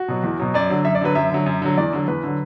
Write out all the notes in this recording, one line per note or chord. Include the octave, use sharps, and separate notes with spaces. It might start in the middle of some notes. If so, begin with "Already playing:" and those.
Already playing: F#4
B2 F#3
E2
B2 F#3
F#2 D5
D3 F#3
F#2 E5
D5
D3 F#3 B4
F#2 E5
D3 F#3
F#2
D3 F#3
E2 D5
D3 F#3
E2 B4
D3 F#3